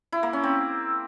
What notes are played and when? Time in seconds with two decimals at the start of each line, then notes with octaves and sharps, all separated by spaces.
0.12 E4
0.23 A#3
0.33 C#4
0.44 C4